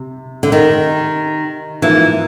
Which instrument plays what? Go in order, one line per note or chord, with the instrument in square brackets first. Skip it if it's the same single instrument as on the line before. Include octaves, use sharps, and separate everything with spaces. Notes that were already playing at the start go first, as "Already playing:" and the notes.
Already playing: [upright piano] C3
[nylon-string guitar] D3
D#3
[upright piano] G#2 F3 A#3 D#4 [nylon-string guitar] E3